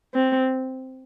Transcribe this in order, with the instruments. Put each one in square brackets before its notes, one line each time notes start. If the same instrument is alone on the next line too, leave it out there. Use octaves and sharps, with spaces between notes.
[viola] C4